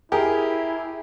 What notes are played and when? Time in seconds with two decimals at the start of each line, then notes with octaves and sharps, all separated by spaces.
0.12 E4 G4 G#4 A#4